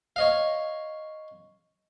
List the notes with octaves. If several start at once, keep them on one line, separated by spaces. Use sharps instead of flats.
C#5 D#5 F5